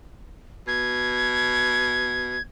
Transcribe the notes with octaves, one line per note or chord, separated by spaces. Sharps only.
B2 G#6